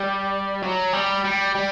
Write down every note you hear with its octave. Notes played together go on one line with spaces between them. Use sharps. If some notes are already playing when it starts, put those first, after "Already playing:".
Already playing: G3
F#3
G3
G3
G3